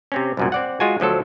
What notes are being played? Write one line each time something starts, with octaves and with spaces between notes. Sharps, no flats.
C3 C4 C#4
C2 F#2 A#2
C4 D5 F#5
G#3 F4 F#4 G#5
D2 F3 F#3 A4